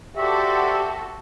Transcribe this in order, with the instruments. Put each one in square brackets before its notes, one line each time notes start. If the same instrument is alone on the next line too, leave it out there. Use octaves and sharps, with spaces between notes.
[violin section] F#4 A4 [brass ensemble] G4 C5 D5 [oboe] E5